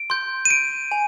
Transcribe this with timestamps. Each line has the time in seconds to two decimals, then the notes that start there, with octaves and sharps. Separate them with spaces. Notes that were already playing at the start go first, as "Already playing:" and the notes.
Already playing: D7
0.10 C6 G6
0.45 D#7
0.50 D7
0.91 G#5